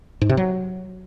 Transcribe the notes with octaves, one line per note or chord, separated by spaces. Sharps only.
G#2
C3
F#3